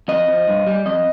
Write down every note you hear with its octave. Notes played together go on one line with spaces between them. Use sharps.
F2 D#5
F3
G2
G3
F2 D#5